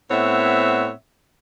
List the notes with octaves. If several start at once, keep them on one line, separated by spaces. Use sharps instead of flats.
A2 B3 C4 C#5 E5 F#5